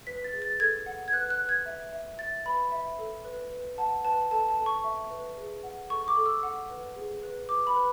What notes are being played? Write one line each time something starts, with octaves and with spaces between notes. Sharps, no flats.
B4 B6
A6
G#4
A6
A4 G#6
F#5
G#6
B4 F#6
F#6
B4
G#6
E5
E5
E5 A6
B4 B5
E5
A4
B4
B4
F#5 A5
B4 A5
A4 A5
A5
A4
C#6
E5
B4
G#4
F#5
A4 C#6
D6
A4
E6
F#5
B4
G#4
B4
B4 D6
B5
B4